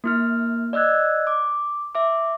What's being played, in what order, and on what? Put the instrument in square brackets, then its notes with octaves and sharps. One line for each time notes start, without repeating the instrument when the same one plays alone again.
[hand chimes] A#3 E4 F6
D5 D#5 E6 F#6 G#6
D6
E5 D6